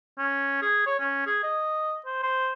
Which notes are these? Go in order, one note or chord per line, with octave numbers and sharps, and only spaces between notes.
C#4
G#4
C#5
C#4
G#4
D#5
C5
C5